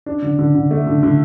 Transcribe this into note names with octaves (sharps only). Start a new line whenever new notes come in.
D4
D3
D3
D3
A3
D3
D3